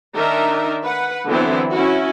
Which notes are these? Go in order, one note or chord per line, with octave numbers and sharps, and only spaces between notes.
D#3 D4 D#4 A#4 E5
B4 F#5
D3 E3 F#3 B3 C4 E4
C#4 E4 F#4